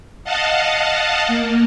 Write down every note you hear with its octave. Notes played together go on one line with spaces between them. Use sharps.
D#5 F5 F#5 A5
A#3